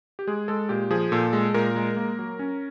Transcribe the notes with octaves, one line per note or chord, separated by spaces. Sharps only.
G4
G#3 G#4
G#3 A4
A#2 G4
F3 G#4
A#2 A4
G#3
A#2 A#4
G#3
A#3
F#3
C#4